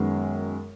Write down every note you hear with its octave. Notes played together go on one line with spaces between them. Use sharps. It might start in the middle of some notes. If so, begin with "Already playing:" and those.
Already playing: F#2 D#3 G#3 B3